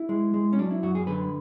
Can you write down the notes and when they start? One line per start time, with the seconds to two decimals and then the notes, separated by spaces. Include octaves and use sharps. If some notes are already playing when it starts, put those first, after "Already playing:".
Already playing: E4
0.09 G#3
0.34 G#3
0.53 C#4
0.59 F#3 D4
0.71 E4
0.83 F#2 F#4
0.95 G#4
1.07 D3 B4